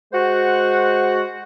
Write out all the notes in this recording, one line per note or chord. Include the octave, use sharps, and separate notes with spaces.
G#3 F#4 C5 F#5